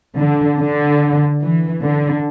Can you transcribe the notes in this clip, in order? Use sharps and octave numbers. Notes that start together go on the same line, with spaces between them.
D3
D3
E3
D3